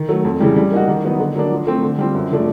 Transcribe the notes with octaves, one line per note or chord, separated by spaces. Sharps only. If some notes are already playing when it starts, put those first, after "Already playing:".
Already playing: D#3
F#3 A3
F2
C#3 E3 G3
G3
A#3 D#4 F#4
D#3
F#3 B3 D#4
D3
F#3 A#3 D4
F3
A3 C4
D3
G3 C4 F4
F#2
C#3 F3 A3 D4